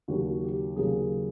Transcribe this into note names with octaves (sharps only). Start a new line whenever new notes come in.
D#2 C#3 F#3 A#3 F#4
G4
D#2 C#3 F#3 A#3 G#4